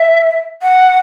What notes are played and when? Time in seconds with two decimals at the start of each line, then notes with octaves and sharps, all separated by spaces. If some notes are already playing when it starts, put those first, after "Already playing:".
Already playing: E5
0.62 F#5